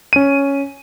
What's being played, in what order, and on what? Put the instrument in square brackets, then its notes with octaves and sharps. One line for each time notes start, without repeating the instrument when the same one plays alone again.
[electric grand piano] C#4 D#7